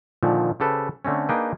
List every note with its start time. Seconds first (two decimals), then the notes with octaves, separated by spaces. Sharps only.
0.23 A#2 D3 D#3 F3
0.60 C#3 G4 A4 B4 C5
1.05 D3 A3 C4 C#4
1.29 A#3 D4 D#4 G#4 B4 G5